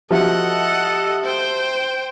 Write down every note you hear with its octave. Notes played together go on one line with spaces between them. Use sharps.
F3 F#4 G4 A4 D#5 E5 F#5 A5
C5 G5